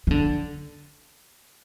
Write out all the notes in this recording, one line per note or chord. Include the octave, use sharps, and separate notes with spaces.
D#3
D3